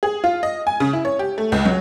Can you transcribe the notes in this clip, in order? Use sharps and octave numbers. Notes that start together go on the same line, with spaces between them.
G#4
F4
D#5
G#5
C#3
E4
C#5
G4
A3
C#2
F#3